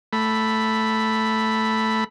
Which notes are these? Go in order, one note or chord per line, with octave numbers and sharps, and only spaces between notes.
A3 B5